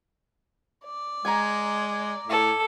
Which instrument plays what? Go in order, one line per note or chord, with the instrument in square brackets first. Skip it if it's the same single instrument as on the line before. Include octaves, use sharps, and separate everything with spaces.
[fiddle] D5
[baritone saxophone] G#3 [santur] G#5 A#5
[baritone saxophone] A2 [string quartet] A4